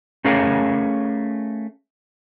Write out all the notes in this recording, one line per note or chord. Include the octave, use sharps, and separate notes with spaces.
A3 C#4 G#4 A#4 C#5 F5